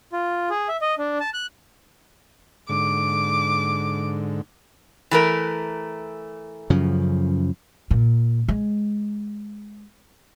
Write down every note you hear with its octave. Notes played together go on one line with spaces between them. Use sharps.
F4
G#4
E5
D#5
D4
A5
F#6
G#2 D3 D6
E3 A3 A#4
F#2 C#3 F3
A#2
G#3